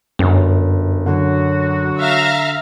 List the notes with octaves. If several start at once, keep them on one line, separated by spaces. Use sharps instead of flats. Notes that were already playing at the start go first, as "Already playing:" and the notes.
G1 F#2
D3 F#3 F#4
E5 F5 A#5